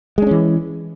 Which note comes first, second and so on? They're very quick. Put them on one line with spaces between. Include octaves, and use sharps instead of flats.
G#3 D4 C#4 E3